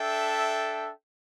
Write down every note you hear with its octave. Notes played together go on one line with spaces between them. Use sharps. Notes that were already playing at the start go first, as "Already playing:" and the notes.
Already playing: D4 A4 E5 G5